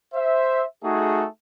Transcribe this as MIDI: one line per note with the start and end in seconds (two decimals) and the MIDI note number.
0.14 0.64 72
0.14 0.64 76
0.83 1.26 57
0.83 1.26 63
0.83 1.26 66
0.83 1.26 68